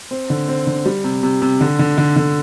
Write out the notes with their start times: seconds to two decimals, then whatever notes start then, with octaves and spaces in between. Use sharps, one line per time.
0.11 C4
0.30 D3
0.48 C4
0.67 D3
0.86 G3
1.04 C3
1.23 C3
1.42 C3
1.61 D3
1.79 D3
1.98 D3
2.16 D3